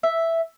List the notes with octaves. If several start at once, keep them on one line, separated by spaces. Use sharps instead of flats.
E5